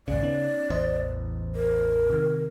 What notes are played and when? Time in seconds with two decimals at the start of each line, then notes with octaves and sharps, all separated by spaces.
0.08 A#1 D#2 G#2 C#3 D5
0.23 B3 C#4 D#4
0.70 A1 E2 C5 D#5
1.55 A#4
2.10 C3 D#3